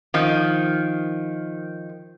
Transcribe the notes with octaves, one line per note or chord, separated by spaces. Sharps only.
D#3 F3